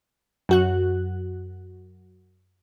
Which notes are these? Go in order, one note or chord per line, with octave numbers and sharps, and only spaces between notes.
F#2 F#4 F#6